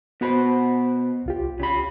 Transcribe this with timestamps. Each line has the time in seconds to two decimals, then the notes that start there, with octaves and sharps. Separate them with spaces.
0.21 B2 B3 F#4 C5 B5
1.26 C2 F4 G4
1.60 C#3 B5